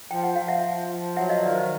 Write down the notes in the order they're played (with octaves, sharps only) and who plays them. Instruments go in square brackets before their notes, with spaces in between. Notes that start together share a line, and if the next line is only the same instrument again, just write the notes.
[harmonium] F3 [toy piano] G5
[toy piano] F#5
[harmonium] F3 [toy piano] F5
[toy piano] E5 F#5
[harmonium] F3
F3
[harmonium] F#3 [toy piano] E5 F#5
[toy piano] D#5 F5
[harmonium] D#3 [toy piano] D5 E5
[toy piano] C5